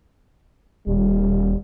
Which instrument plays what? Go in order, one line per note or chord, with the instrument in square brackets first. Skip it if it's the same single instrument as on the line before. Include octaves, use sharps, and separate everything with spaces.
[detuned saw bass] D#1 [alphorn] G3